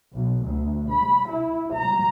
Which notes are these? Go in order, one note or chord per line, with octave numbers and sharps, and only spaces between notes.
B1
D2
B5
E4
A#5